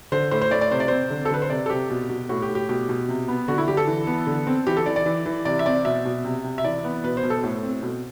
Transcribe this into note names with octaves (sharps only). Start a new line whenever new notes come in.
D3 C5
A2 C5
C5
A2 D5
D5
C3 C5
D5
C4 C5
D3
A4
D3 B4
C5
C3 D5
A4
C3 G4
B2
B2
A2 F#4
G4
A2
G4
B2 G4
B2
C3
B3
D3 F#4
E4
D3 G4
A4
E3
B3
D3
C4
E3 G4
A4
E3 D5
D5
E3
E3
C3 D5
E5
C4 D5
B2 E5
B2
C3
C3
E5
E3 D5
B3
B2 B4
C5
B2
A4
A2
C4
B2